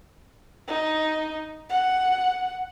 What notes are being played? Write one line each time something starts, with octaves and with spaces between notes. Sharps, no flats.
D#4
F#5